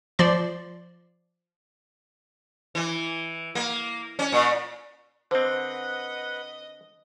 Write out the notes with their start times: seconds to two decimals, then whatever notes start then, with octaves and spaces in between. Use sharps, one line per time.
0.19 F3 D5 C6
2.75 E3
3.55 A#3
4.19 C#4
4.32 A#2
5.31 D3 C4 B4 C5 D#5 F#5